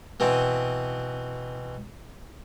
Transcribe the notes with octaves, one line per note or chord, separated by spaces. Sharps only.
B2 E3 B3 C4